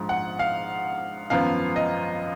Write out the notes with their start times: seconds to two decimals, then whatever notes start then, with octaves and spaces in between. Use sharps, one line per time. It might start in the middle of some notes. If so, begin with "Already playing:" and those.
Already playing: A#1 G#2 F3 G#3
0.09 F#5
0.39 F5
1.30 G#1 F#2 F3 B3 F5
1.76 D#5